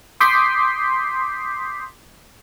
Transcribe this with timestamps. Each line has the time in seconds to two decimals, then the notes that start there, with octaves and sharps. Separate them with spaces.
0.20 C6 D6 D#6 G6 B6 C7